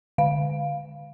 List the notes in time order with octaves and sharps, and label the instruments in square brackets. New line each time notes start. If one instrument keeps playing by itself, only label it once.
[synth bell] D3 F5